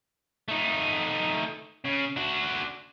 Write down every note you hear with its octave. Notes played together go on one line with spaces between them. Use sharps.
A3 D#4
C#3
D4 F#4